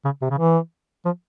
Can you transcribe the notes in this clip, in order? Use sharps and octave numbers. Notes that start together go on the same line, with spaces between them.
C#3
C3
C#3
E3
F3